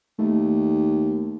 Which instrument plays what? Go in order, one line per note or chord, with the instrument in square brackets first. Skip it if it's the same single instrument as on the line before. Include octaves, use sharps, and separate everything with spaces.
[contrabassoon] D#2 [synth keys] A3